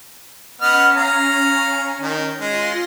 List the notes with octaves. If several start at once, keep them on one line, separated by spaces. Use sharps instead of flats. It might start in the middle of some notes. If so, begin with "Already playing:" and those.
B3 C#4 D#5 F6
F5 A#5
D#3
G#3 F4 C6 A#6